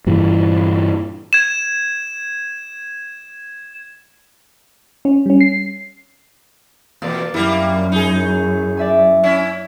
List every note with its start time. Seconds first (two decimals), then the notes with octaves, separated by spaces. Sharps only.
0.07 G2 A#2 E3
1.33 G#6 E7
5.05 C#4
5.26 G3 C#4
5.41 C7
7.02 E2 B2 A#3 D5 A6
7.34 F#2 G3 A#3 E4
7.92 D#4 G#4
8.77 D5 E5 G#5
9.23 C#4 E4